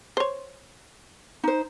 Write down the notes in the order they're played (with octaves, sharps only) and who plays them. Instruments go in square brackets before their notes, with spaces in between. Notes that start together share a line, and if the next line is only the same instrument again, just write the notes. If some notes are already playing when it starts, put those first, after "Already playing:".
[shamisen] C5 C#5
[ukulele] D#4 C5